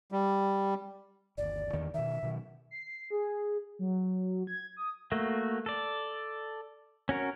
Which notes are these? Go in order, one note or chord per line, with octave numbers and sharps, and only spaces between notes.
G3
G1 D#2 D5
E2 D#3 B3
B2 D#3 E5
B2 D#3 F#3
C7
G#4
F#3
G#6
D#6
A3 A#3 F#4
A4 D5
C#4 F#4 A#4